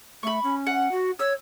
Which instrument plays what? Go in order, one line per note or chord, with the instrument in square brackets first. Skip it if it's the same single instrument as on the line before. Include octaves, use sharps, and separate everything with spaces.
[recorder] A3 [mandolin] B5 C#6
[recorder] C#4
[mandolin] F#5
[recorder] F#4
[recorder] C#5 [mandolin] E6